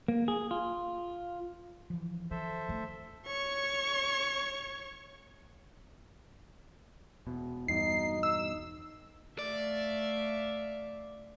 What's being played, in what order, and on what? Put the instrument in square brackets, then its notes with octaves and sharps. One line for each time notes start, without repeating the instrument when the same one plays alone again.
[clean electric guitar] A#3
G#4
F4
[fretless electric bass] E3 F3
[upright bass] D#3 [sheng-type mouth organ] A4 C5 E5
[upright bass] D#3 A3
[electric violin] C#5 C#6
[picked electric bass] E1 B2
[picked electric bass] E2 G2 B2 [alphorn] D#4 [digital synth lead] C7
[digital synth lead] E6
[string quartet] A3 E5 F5 [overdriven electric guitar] D5